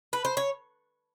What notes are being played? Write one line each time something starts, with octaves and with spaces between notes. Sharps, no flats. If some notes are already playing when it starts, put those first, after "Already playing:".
B4
C5
C#5